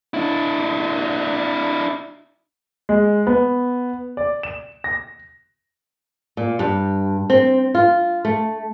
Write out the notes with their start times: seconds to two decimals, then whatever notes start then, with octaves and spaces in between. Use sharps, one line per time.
0.14 D4 E4
2.89 G#3
3.27 B3
4.17 D5
4.43 E7
4.84 A#6
6.37 A#2
6.59 G2
7.30 C4
7.75 F4
8.25 A3